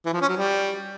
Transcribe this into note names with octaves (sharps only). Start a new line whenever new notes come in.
E3
F3
C#4
F#3
G3